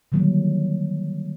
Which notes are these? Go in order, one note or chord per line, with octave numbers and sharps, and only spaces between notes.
D3 D#3 F#3 G3 A#3